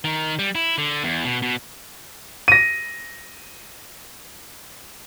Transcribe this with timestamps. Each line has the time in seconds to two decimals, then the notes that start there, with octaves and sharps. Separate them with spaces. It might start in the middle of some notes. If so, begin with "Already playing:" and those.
0.04 D#3
0.39 G3
0.55 E4
0.78 D3
1.04 E2
1.25 B2
1.42 B2
2.48 A#6 D#7